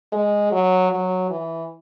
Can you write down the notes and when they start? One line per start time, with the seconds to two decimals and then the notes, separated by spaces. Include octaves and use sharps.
0.12 G#3
0.52 F#3
0.91 F#3
1.30 E3